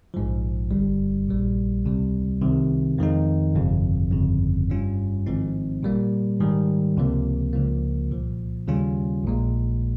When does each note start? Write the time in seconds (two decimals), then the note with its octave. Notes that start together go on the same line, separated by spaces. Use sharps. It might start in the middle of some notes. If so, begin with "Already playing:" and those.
0.14 A#1 G#2 F3
0.71 G1 G2 G3
1.28 A#1 A#2 G3
1.85 C#2 C3 G3
2.41 C2 C3 D#3
2.98 F2 D#3 G#3 D#4
3.55 G1 F2 C3
4.12 G1 F2 C#3
4.70 G2 G3 C#4 F4
5.26 G#1 G#2 F3 C4 D#4
5.83 A#2 G3 A#3
6.40 G#2 D#3 G3
6.97 C#2 C3 F3 A#3
7.53 C#2 C#3 F3 A#3
8.10 C2 A#2 F3
8.68 D#2 C#3 G3 C#4 F4
9.24 A#1 A#2 G#3